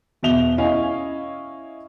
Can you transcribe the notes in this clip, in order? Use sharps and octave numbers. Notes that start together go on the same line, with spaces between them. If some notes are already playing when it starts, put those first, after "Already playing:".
E2 B2 E5 F7 G7
C#4 E4 D#5 F5 G#5